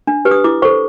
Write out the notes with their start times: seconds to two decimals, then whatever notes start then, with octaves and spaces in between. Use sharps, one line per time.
0.07 D4
0.25 G4 B4
0.31 D#6
0.44 E4 D6
0.62 A4 C5 C#6